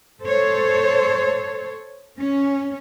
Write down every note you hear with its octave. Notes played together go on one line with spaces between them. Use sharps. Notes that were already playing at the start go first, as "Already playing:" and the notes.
A4 C5 C#5
C#4